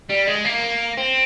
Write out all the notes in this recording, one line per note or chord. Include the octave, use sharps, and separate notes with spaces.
G3
G#3
A#3
C4